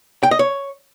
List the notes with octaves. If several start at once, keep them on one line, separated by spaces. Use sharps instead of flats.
G5
D#5
C#5